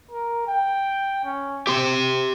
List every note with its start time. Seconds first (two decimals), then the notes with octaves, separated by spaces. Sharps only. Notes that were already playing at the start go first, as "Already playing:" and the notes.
0.11 A#4
0.47 G5
1.25 C#4
1.67 C4 G4 C6